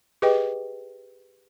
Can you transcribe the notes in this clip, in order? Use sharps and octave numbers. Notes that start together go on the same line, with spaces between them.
G4 G#4 B4 D#5 G5